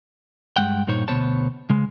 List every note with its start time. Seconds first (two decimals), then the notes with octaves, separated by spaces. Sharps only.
0.57 G2 G#3 F#5 G5
0.87 G2 A#2 D#4 C5 C#5
1.08 D2 B2 B3 C5 C#5 A5
1.70 C#3 G#3